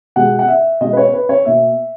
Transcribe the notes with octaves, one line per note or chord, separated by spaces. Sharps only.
B2 G#3 F#5
F#5
E5
B2 G#3 D#5
B4
C#5
B4
C#5
B2 A#3 E5